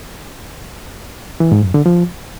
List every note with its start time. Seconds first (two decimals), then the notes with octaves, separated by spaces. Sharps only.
1.40 E3
1.52 G#2
1.63 F#2
1.74 D3
1.86 F3